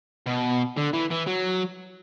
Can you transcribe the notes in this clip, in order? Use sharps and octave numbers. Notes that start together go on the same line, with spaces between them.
B2
D3
E3
E3
F#3